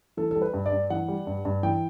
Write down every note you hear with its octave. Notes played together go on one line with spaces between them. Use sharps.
E3 A4
G3 A4
B4
G2
D5
G2
E3 F#5
G3
G2
G2
E3 G5